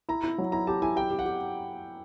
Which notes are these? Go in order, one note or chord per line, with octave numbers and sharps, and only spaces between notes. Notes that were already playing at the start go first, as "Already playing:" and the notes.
E4 A#5
E4
F#3
E4 A#5
G4 A5
E4 G#5
G4 G5
G4
F#5
G4